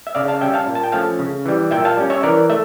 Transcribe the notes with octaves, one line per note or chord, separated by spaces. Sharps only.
E5
C#3 D5 F5
F5 A5
G3 C#4 E5 G5
F5 A5
A#2
A5
G5
F3 A3 C#4 F5 A5
C#3
E3 G3
A#2 E5 G5
F5 A5
G3 C#4
C#5 E5
E3 A#4 D5
A3 E5